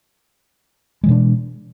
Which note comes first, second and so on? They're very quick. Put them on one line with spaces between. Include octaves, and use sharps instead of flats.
G#3 E3 B2 D4